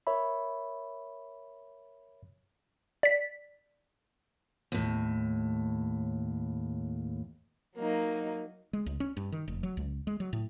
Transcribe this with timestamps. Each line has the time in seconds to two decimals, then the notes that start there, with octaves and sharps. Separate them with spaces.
0.07 A#4 C#5 E5 B5
3.03 D5 B6
4.72 D#2 A2
7.76 F#3 A#3 D#4
8.73 G#3
8.86 C#2
9.00 C#4
9.17 G2
9.32 D#3
9.48 F1
9.63 F#3
9.77 C#2
10.07 G#3
10.20 F#3
10.33 A2